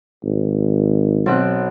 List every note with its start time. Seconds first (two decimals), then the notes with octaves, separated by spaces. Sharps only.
0.23 G#1
1.26 B1 C4 F#6